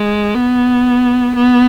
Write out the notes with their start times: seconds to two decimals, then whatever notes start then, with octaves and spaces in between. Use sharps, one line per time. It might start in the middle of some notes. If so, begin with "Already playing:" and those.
Already playing: G#3
0.35 B3
1.36 B3